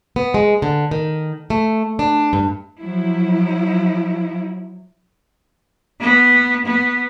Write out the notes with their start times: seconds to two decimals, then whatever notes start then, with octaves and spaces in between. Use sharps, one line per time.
0.16 B3
0.34 G#3
0.62 D3
0.91 D#3
1.50 A3
1.99 D4
2.33 G2
2.80 F3 F#3 E4
6.01 B3
6.66 B3